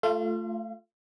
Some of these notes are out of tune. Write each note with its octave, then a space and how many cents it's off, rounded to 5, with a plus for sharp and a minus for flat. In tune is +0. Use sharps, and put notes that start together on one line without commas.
A3 +0 F4 +0 F5 -45